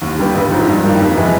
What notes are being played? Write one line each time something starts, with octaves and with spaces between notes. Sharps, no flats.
D#2
D3 G3 B3
A1
G#2 F3
G2
D#3 G3 A#3
F2
C3 E3 G#3 B3